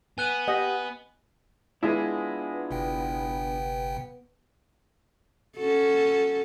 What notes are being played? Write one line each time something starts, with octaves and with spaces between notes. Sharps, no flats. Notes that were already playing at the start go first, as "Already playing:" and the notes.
B3 G#5 F#6 D#7
G4 D#5 F#5
G#3 B3 D4 E4 F4 G#4
G1 C3 G5
C#4 F#4 A4